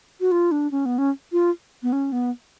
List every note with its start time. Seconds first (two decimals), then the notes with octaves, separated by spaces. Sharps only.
0.21 F#4
0.32 F4
0.52 D4
0.71 C#4
0.86 B3
0.98 C#4
1.32 F4
1.83 B3
1.93 C#4
2.12 B3